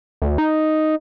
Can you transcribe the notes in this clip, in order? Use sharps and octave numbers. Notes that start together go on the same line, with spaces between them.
D2
D#4